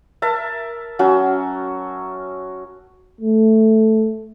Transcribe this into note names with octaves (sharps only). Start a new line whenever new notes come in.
A#4 E5 A5
F#3 C#4 F#4
A3